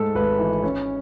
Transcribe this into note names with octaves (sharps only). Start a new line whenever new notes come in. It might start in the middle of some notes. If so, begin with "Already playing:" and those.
Already playing: G#2 A3 A4
G#1 B4
E3
C#4